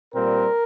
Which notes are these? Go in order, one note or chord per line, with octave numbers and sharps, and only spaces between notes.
A#2 G3 C4 A#4